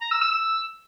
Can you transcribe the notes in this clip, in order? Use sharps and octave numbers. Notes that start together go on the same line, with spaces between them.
A#5
E6
E6
E6